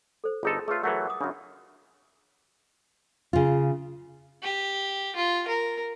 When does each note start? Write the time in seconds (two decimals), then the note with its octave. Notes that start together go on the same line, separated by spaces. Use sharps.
0.24 A4 C5
0.43 G1 D#4 F4 G#4 A4 C6
0.68 A3 F4 G#4 B4 C#5
0.83 E3 F#3 A3 A#4 F#5
1.06 F#5 D6 D#6
1.21 F#2 C#3 D4 E5
3.33 C#3 F4
4.43 G4
5.16 F4
5.48 A#4